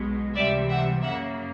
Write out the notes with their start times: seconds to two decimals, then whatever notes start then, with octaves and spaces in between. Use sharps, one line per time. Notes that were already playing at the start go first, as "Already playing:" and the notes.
Already playing: B1 B2 G#3
0.35 C#2 C3 E3 G3 D5 E5
0.69 E5 F#5
1.02 F#2 C#3 F#3 A#3 E5 F#5